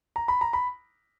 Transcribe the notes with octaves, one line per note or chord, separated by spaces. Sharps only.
A#5
B5
A#5
B5